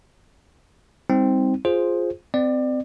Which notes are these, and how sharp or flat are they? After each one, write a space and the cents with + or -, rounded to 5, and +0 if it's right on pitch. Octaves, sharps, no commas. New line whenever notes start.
G3 +35 C4 +0 D#4 +35
F4 +5 G#4 +0 C5 +0
C4 -25 D5 +25